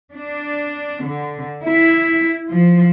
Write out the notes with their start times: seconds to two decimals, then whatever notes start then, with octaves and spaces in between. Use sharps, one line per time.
0.13 D4
1.04 D3
1.64 E4
2.51 F3